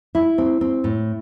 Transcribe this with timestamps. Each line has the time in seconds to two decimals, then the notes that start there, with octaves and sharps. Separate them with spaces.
0.15 E4
0.38 C4
0.61 C4
0.84 A2